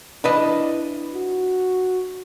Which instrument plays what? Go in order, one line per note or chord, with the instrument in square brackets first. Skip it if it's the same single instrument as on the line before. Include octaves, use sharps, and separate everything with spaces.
[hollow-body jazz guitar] D4 B4 D#5 [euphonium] E4
[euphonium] F#4